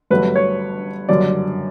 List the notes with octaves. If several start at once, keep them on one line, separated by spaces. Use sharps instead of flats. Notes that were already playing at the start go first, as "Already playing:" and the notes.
G1 G2 F#3 A3 B4
C#5
F#1 F#2 D3 G3 D5